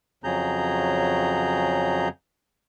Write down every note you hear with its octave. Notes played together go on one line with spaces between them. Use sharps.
F2 C#3 F#3 G#4 A#5 G6